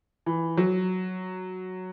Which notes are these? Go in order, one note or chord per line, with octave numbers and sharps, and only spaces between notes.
E3
F#3